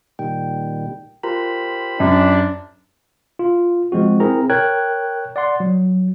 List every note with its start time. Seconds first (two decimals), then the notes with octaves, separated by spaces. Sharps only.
0.19 A#2 D#3 G3 G5
1.23 F4 G4 A#4 C5 A#5 B5
2.00 F#2 D4
3.39 F4
3.92 F3 G#3 C4 F#4
4.20 C4 E4 G#4 A#4 A#5
4.50 A#4 C#5 G5 F#6 G#6
5.36 D5 F#5 C6
5.60 F#3